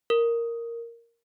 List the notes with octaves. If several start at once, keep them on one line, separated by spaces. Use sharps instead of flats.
A#4